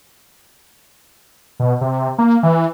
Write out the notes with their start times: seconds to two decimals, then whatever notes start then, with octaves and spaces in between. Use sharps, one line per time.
1.60 B2
1.81 C3
2.18 A#3
2.43 E3